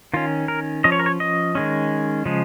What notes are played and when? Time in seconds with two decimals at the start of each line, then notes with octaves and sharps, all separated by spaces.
0.14 D#3 C#4 F4
0.48 A#4
0.84 F3 C#4 D#5
0.92 C#5
1.00 A#4
1.06 C#5
1.20 D#5
1.55 D#3 G#3 C#4
2.25 C#3 F3 G#3